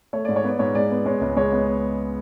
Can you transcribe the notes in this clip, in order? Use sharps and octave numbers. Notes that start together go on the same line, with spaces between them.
A3 C#5
G#2 D5
C#5
B3 D5
G#2 C#5
G#3 D5
B3
G#3 C#5
C#2
G#3 C#5
B3